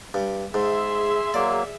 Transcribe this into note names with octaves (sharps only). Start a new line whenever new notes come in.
G2
G#2 G#4 E5 C6
F#3 A#3 D5